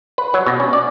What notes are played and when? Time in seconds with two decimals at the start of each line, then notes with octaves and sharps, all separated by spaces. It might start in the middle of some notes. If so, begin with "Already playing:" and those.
0.18 B4
0.34 F#3
0.46 B2
0.60 C#4
0.73 D5